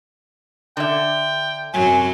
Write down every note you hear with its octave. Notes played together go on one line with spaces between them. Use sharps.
D3 E5 G5
F#2 C3 F#3 G#5